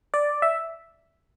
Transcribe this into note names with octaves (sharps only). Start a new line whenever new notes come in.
D5
E5